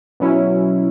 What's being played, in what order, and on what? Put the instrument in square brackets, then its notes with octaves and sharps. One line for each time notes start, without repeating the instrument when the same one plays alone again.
[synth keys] B2 F#3 C#4 E4